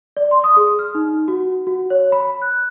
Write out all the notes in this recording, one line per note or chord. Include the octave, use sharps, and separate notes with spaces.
D5
C6
D#6
G#4
F6
D#4
F#4
F#4
C#5
B5
F#6